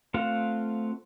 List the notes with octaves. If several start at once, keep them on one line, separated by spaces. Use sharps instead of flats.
A3 C4 F4 F5 F#5